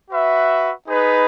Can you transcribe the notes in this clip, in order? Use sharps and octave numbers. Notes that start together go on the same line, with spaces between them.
F#4 B4 E5
D#4 G#4 B4